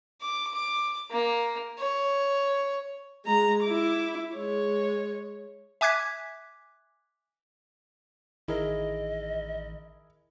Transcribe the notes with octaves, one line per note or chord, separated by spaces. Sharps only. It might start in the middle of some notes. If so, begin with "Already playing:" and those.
D6
D6
A#3
C#5
G#3 A#5
E4 D6
G#3 C#5
E5 G#5 D6 F#6 G#6 B6
A1 D#3 E4 G#4 A#4 D#5